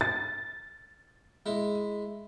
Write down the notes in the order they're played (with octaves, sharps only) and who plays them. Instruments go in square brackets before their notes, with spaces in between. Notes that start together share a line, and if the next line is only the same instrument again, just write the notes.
[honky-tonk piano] A6
[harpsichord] G#3 E4